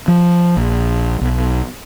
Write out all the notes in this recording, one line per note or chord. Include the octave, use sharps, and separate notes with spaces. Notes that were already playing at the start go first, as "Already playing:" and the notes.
F3
A#1
B1